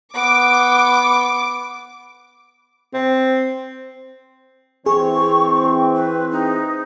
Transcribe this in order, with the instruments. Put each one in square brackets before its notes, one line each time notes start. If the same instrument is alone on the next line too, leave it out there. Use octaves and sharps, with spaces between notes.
[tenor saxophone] B3 [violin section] D6
[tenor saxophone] C4
[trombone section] E3 C4 [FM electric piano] G#4 [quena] C#6
[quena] B4
D#4